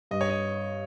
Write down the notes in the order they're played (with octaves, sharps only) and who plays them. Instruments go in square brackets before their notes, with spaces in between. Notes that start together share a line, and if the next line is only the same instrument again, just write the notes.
[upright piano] G2 [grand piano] D#5
[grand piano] C#5
D#5